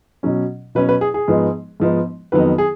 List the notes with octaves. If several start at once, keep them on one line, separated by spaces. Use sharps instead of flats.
B2 F#3 C#4
B2 F#3 C#4 B4
B4
G#4
G#4
G#2 F3 B3 D#4
G#2 F3 B3 D#4
F2 D#3 F#3 B3 D#4 B4
G#4